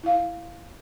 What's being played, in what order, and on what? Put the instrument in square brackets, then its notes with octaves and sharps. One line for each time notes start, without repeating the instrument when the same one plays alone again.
[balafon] E4 F5